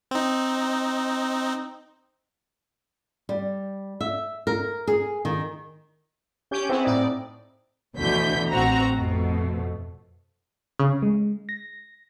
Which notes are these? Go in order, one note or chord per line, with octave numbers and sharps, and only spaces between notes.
C4 D#4
G3
E5
A#4
G#4
D#3
C#4 G4 G6
B3 C4 E4 G#4
A2 D#4 D5
D2 B2 D3 E3 G6 B6
A1 C4 F#4 A#5
F2 B2 A3
C#3
G#3
A#6